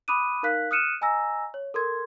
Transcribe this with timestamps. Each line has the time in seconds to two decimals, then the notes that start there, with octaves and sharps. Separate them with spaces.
0.08 B5 D6 D#6 F#6 D#7
0.43 D#4 A#4 F5 F#6 B6
0.71 D#6 F6 F#6 C#7 D#7 E7
1.01 D#5 G#5 A#5 E6 A#6
1.54 C#5
1.74 A4 A#4 C6 G#6